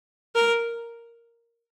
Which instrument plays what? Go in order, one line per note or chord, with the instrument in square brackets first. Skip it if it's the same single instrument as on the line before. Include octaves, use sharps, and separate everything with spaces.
[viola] A#4